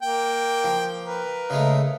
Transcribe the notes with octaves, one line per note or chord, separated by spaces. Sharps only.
A#3 G5
F3
A#4 B4
C#3 G#3 A3